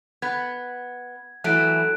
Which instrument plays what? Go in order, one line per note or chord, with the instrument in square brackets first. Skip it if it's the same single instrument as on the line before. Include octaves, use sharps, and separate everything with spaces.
[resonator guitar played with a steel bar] B3 [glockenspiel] G#6
[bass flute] E3 [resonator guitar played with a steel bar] F#3 A3 [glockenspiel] F#6 D7